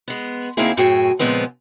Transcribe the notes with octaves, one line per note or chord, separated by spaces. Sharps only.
G#3 B3
D2 A#3 C4 D#4 E4 G#4
F#2 A2 F#4 G#4 G5 G#5
A#2 C#3 F3 G#3 B3 C4